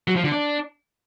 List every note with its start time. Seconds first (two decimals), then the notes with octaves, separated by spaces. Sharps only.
0.08 F#3
0.16 F3
0.24 D3
0.32 D4